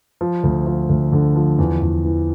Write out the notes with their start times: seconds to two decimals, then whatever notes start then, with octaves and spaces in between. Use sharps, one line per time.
0.21 F3
0.44 D2
0.66 F3
0.89 D2
1.12 D3
1.36 F3
1.59 E2
1.81 E2
2.05 E3